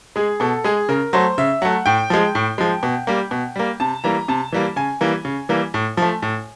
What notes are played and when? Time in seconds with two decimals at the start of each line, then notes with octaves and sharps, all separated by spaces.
0.16 G#3 G#4
0.40 B2 A4
0.64 G#3 G#4
0.89 C#3 A#4
1.13 F#3 A3 C5
1.38 C#3 E5
1.62 F#3 A3 F#5
1.86 A2 G5
2.10 F3 G#3
2.35 A2
2.58 F3 G#3
2.83 B2
3.07 G3 A#3
3.31 B2
3.56 G3 A#3
3.80 C3 A5
4.04 E3 G3 A#3 A#5
4.28 C3 A5
4.52 E3 G3 A#3
4.76 C#3 G#5
5.01 E3 G3 A#3
5.25 C#3
5.49 E3 G3 A#3
5.74 A2
5.97 F3 A3
6.22 A2